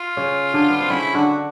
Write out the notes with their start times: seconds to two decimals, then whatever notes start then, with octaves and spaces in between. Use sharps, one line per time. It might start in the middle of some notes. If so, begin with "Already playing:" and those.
Already playing: F4
0.17 C#3 C#4
0.54 D3 D4
0.70 B3
0.80 C4
0.90 C#3 C#4 E4
1.14 D3 D4 F#4